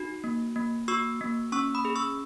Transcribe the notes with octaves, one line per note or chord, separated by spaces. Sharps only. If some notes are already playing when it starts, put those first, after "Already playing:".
Already playing: D#4 F#4
A#3
A#3
F#4 C#6 E6
A#3
C#4 C#6 E6
B5 D#6
G#4
C#6 E6